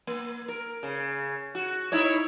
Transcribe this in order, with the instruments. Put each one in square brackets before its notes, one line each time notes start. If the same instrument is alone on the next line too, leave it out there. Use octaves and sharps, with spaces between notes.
[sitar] A#3
A#4
C#3
F#4
D#4 E4 C#5